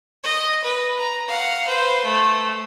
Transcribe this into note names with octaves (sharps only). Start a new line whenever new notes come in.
D#5
B4
A#5
F5 F#5
B4 C5
A3